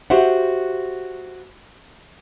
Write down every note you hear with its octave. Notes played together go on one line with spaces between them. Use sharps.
F#4 G4 C5 E5 F#5